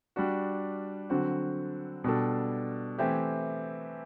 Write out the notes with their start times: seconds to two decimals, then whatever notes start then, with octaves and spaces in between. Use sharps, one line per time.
0.16 G3 D4 F#4
1.10 D3 F#3 C4 F#4
2.04 B2 G3 D4 A4
2.98 E3 A3 C4 E4 G4